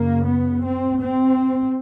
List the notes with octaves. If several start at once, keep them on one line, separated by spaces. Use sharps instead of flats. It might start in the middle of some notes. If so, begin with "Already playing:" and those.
Already playing: F#2 C#3 A#3
B3
C4
C4